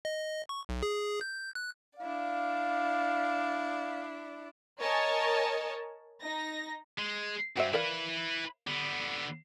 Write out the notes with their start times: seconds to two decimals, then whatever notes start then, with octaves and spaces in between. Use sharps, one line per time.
0.05 D#5
0.49 C#6
0.69 B1
0.83 G#4
1.21 G6
1.55 F#6
1.99 D4 E4 D5 F5
4.80 A#4 C#5 D#5 G#5 A5
6.22 D#4 A#6
6.99 G#3
7.57 G2 F#4 C5 E5
7.74 E4 A#4 B4 D5 F5
8.67 D3 B3